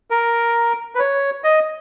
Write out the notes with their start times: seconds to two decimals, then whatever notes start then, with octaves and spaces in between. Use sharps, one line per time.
0.11 A#4
0.95 B4
0.99 C#5
1.44 D#5